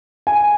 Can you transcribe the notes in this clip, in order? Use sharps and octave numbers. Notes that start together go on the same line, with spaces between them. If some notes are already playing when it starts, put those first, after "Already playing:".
G#5